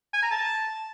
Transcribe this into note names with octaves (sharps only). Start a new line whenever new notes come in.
G#5
A#5
A5